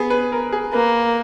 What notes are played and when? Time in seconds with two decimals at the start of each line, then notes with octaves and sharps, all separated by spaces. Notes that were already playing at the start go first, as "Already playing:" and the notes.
Already playing: B3 G#4
0.10 B4
0.32 A#4
0.52 G#4
0.73 A#3 B4